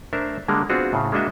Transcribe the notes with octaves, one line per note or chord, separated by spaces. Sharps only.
A3 D4 A#4 C5 E5
D3 G3 G#3 A#3 A#4
B3 C4 D4 F4 F#4 G#4
A2 C#3
G#3 A#3 D4 F#4 D#5 E5